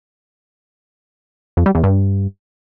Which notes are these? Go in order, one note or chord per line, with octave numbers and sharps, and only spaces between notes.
F2
G3
E2
G2